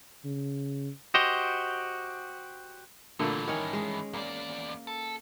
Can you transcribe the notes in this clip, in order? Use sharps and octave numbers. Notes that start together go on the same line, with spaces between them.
C#3
F#4 G4 C5 D#5
G2 A#2 D3 E3 A3
D#3 C#4 C#5
G#3
E2 A#3 D5
A4